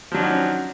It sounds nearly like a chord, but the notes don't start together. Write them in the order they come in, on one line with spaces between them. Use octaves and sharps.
F3 F#3 D4 D#3 C#4